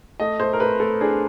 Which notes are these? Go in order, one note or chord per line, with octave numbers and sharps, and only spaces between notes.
A3 D#5
A3 C5
A#4
A3 B4
A3 A4
D4 G#4